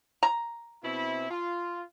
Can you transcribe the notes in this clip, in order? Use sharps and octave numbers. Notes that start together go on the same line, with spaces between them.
A#5
B2 C4 E4
F4